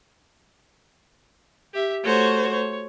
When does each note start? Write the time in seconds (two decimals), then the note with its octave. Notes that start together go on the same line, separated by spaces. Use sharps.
1.74 G4 E5
2.04 A3 F#4 C5 C#5
2.52 C#5